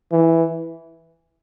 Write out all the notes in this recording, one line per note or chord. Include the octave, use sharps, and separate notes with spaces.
E3